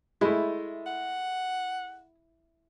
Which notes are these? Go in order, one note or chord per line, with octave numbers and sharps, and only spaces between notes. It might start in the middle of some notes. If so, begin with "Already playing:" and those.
G#3 A3 E4
F#5